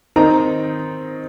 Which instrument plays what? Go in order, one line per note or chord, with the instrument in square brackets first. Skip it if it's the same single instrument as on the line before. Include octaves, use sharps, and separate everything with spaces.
[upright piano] D#3 C4 D#4 A#5